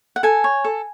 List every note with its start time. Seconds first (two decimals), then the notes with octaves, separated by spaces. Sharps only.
0.16 F#5
0.23 A4 G#5
0.44 C#5
0.64 A4